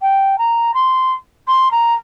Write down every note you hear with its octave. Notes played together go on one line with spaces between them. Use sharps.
G5
A#5
C6
C6
A#5